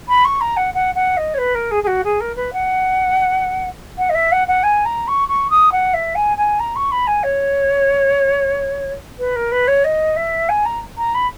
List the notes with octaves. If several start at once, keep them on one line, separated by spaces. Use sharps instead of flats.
B5
C#6
A#5
F#5
F#5
F#5
D#5
C#5
B4
A#4
G#4
G#4
F#4
G#4
A#4
B4
F#5
F#5
D#5
E5
F#5
F#5
G#5
A#5
C#6
C#6
D#6
F#5
E5
G#5
G#5
A#5
C#6
B5
G#5
C#5
B4
A#4
B4
C#5
D#5
E5
G#5
A#5
A#5
B5